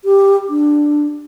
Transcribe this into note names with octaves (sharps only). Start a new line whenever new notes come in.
G4
D4